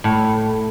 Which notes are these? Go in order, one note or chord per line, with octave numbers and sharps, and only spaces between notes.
A2